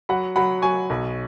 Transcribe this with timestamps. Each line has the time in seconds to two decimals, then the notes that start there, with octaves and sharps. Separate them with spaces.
0.09 F#3 F#5 B5
0.36 F#3 F#5 B5
0.62 F#3 G#5 C#6
0.90 B1